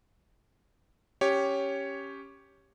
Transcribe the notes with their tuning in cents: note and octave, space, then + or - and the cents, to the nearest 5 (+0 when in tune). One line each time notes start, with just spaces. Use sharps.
C#4 +0 G4 +0 C#5 +0